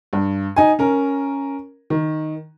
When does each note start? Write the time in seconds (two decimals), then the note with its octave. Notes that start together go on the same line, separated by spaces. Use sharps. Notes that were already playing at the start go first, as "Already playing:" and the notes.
0.13 G2
0.56 D#4 G#5
0.79 C#4 A#4
1.90 D#3